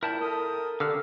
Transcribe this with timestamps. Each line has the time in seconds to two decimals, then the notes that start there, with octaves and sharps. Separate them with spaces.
0.03 A#2 F3 E4 A#4 G5 A5 B5
0.21 A4 A#4 D#6
0.80 D3 F#4 G4 A#4 F5 E6 F6